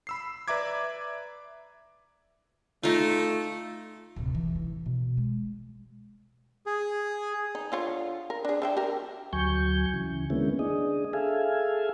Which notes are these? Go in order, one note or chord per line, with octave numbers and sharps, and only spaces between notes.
B5 E6 C7
B4 D5 E5 A#5 D6 G#6
A3 D#4 F4
D1 C3
E3
E4
B2
G#3
G#4
D#4
D3 F4 C#5
A#4
D4 G#4
D3 E5 G5
G4 A#4
D2 F#3 G#5 C#6 G6
C#3 E3
D3 G#3 A#3 B3 C#4 E4
D4 G#4 D#5
G#4 A4 E5 F5 G#5